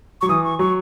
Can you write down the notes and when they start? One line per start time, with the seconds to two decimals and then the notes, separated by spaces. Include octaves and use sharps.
0.21 F#3 C#6
0.29 E3 D#6
0.44 C#6
0.59 F#3 C#6